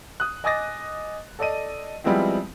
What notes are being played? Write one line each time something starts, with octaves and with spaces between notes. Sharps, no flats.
D#6 F#6
D#5 G#5 D6 D#6 A6 A#6
A4 D5 D#5 D#7
F3 G3 G#3 B3 C4 E4